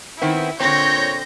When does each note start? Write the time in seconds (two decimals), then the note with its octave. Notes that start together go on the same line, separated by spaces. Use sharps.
0.21 D#3 B3 C4 E4
0.60 A#2 D3 C4 C#5 G6 A#6